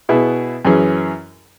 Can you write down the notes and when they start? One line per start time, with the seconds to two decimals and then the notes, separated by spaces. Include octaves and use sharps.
0.09 B2 B3 E4 G#4
0.65 F#2 E3 C#4 G#4